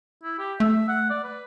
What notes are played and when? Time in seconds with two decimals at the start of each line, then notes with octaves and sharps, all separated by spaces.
0.23 E4
0.39 G4
0.60 A3 E5
0.88 F#5
1.10 D5
1.24 B4